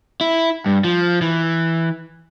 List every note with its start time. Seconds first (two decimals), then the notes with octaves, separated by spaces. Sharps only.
0.21 E4
0.66 G2
0.84 F3
1.22 E3